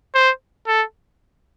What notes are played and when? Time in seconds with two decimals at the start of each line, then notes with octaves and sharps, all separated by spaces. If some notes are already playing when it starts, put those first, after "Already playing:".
0.15 C5
0.67 A4